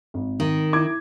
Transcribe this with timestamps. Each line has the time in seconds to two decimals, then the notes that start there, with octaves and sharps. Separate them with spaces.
0.14 G#1
0.40 D#3
0.73 E4 D6 G#6